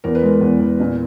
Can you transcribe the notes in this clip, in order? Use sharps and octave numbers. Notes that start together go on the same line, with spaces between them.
E2 A#4
B4
G#3 A#4
E2
E2
A#2